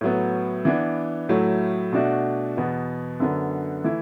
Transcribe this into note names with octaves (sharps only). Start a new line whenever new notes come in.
A2 F#3 B3
E3 B3 D4
A2 F#3 A3 E4
B2 A3 D4 F#4
E2 B2 B3 F#4
F#2 D3 B3
E3 A3 E4